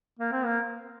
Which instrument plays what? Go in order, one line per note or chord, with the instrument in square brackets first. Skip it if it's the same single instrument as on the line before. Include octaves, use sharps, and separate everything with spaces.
[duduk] A#3
C4
A#3